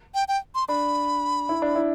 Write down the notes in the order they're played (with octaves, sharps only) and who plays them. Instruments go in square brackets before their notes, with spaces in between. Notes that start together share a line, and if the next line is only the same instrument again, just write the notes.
[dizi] G5
G5
C6
[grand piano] D4 [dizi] B5
[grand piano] E4
D4
E4